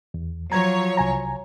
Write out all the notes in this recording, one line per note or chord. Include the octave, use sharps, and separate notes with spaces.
E2
F3 F#3 C#5 A#5 G#6
C2 G#5 A#5